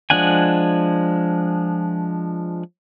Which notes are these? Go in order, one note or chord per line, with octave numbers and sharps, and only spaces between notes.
F3 G#3 D4 F#5 G#5